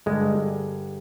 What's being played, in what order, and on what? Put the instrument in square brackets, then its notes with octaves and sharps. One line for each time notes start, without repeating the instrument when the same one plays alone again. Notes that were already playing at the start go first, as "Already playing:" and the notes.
[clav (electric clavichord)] G2 D3 G3 G#3